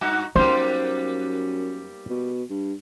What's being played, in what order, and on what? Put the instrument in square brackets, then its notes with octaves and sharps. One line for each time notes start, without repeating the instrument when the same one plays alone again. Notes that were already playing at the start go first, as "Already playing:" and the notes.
[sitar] G2 D#4 F#4
[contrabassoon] F#2 [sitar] G3 A#3 B3 [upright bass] D#4 [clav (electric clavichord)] C5
[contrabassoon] B2
G2